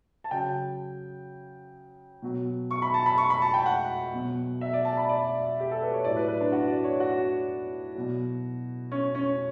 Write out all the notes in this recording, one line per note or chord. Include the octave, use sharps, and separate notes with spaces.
A5
C#3 F#3 G5
B2 F#3
C#6
B5
A5
B5
C#6
B5
A5
G5
F#5
B2 F#3
E5
D5
A5
B5
D5
G4
A4
B4
C#5
A2 F#3 D5
B4
B4
D4
F#4
D5
C#5
F#4
B2 F#3
C#4
C#4